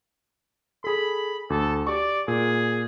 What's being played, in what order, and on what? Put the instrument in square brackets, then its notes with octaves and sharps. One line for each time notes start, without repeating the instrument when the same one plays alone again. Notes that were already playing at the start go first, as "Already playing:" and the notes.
[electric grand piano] G#4 A4 [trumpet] B5
[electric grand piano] D2 [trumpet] A4
[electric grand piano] G4 C#6 [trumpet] D5
[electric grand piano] A#2 [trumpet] G#4